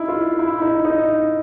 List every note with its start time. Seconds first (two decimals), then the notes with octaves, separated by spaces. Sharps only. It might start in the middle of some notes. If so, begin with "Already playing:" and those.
Already playing: D#4 E4
0.08 F4
0.39 E4
0.62 D#4
0.85 D#4